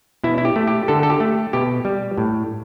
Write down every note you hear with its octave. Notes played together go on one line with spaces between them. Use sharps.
B2 E4
E4
G4
A3
G4
D3 A4
A4
G4
A3
B2 G4
G3
A2